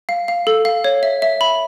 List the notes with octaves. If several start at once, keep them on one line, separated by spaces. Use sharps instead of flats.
F5
F5
A4
F5
C#5
E5
E5
B5